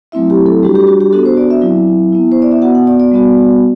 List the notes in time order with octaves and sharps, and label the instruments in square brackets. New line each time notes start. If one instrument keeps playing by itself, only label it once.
[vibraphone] F#3 A3 C4 E4 E5
G4
A4
G3 D4 F#4 G4
G4
F#4
G4
B3 D4 F#4 A4
C5
D5
E5
F#3 C4 E4
B3 E4
C5
D5
E5
B3 F#4 F#5
F#5
D5
D5
G3 B3 F#4